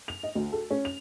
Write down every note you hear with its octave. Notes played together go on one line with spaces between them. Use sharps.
F7
D#5
D2
A4
C#4
F7